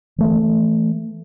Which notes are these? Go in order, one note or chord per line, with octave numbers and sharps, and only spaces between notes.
E3 A3